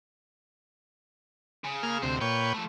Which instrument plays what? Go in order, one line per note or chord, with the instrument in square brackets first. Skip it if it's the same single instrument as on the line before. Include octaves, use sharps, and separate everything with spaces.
[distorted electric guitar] C#3
[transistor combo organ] A#3 G#4 F6
[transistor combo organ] D2 C3 [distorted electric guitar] D#4 C5
[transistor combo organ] A#2 C#5 G5 [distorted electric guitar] B4
[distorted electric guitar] F3 A3